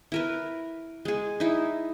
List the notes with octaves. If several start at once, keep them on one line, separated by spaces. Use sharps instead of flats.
E4 A#4 B4
G#3 G#4
D#4 E4